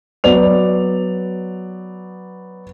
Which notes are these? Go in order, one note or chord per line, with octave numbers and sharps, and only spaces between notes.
F#3 B3 D5 F7